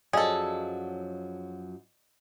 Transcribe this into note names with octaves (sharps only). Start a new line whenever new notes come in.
F#2 F3 F#3 G#4 A4 D5 D#5 F5